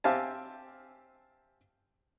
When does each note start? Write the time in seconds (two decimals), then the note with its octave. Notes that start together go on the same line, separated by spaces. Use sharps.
0.04 C4 G4 E5 F5 G#5 A5